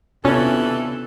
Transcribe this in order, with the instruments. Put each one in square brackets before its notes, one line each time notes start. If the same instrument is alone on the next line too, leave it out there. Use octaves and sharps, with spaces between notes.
[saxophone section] D#2 E3 A4 [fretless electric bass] C3 [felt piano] B3 D4 F4 [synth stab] C#4